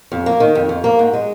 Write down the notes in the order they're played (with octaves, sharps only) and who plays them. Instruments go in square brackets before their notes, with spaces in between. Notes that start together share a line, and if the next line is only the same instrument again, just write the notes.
[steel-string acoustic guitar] F2
A#3
D#3
F2
F2
A#3
G#2
G#3